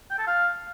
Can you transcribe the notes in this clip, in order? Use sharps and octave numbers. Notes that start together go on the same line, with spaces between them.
G5
A4
F5